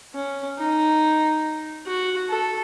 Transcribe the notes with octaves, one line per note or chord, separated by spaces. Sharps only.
C#4
D#4
F#4
A4